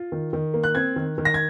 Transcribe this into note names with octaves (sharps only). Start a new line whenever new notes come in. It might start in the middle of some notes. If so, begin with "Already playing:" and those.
Already playing: F4
D#3
D#3
A#3
F#6
C4 G#6
D#3
D#3
A#6
G#6